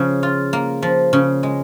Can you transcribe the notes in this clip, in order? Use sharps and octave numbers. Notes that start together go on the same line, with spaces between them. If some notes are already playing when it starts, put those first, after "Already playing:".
Already playing: C#3 F3
F4
A#3
F3
C#3
G#3